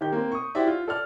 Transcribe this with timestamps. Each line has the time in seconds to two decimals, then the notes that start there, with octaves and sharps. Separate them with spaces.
0.01 D#3 G4 G6
0.12 A#3 C4
0.32 C#6 D#6
0.55 E4 F#4 G4 C5 D5 E5
0.67 F4
0.88 A4 D5 F6